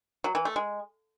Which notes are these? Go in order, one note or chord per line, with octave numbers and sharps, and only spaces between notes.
F#3
E3
A3
G#3